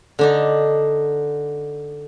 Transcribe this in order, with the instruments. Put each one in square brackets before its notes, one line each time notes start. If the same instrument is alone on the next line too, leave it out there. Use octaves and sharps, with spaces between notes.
[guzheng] D3 D4 D#4